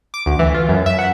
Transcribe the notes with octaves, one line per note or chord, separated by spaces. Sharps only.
D6
D2
E3
F4
F#2
E5
F#5